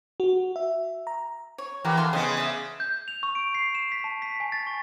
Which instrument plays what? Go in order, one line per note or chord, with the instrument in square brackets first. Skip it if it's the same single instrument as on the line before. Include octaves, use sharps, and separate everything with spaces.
[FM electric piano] F#4
E5
A#5
[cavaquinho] C#5
[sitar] E3 [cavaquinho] G4 A#4 F#5
[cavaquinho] A4 F5 C6
[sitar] C#3 B3 [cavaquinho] D#5 G#5
[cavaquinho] D5 E5
[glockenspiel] G6
F7
C#6
D7
C7
E7
B6
A5
B6
G#5
A6
C#6